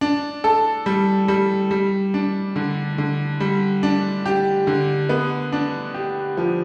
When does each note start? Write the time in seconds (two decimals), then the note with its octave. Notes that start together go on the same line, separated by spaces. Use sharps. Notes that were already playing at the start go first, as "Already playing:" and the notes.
0.01 D4
0.44 A4
0.86 G3
1.28 G3
1.71 G3
2.14 D4
2.56 D3
2.98 D3
3.40 G3
3.83 D4
4.26 G4
4.67 D3
5.09 B3
5.53 D4
5.94 G4
6.37 F3